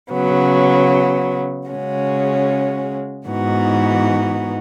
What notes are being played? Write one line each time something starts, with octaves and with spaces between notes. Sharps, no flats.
C#3 F#3 B3
C#3 G#3 C#4 F#4
G#2 E3 B3 D#4 F#4